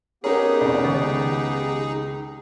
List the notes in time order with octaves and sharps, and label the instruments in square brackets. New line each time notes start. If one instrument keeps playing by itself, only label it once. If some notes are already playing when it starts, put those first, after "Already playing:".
[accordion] B3 G4 [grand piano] C#4 A#4 C#5 [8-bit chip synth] D#4 G#4
[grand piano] F1 D5 [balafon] C#4
[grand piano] C#2 [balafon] D#3